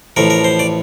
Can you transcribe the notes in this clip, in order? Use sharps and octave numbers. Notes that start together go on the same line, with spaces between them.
A1 A2 F3 A#4
A#4
C5
D5